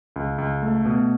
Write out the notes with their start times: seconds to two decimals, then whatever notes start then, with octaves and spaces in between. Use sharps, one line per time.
0.16 C#2
0.38 C#2
0.62 A3
0.85 B2